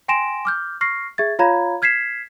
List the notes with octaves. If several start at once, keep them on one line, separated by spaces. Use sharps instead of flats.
G5 G#5 C6 A#6 D7 E7
D6 F6 G6
C#6 F6 A#6 C7
G#4 E5 G#6 A6
F4 C#5 F5 A#5 B5 G#6
F6 G#6 B6 C7 E7